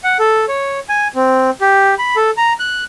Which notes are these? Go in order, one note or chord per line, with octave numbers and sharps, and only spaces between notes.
F#5
A4
C#5
G#5
C4
G4
B5
A4
A#5
F#6